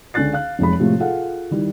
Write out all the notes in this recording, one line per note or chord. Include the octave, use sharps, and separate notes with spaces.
C#2 D3 C#4 F#6 A6 C7
F5 F#6
F1 B1 F2 G#3 C#5 B5
A2 C3 F3 G#3 A3 A4
F4 G#4 A4 F5 F#5
D#3 G3 E4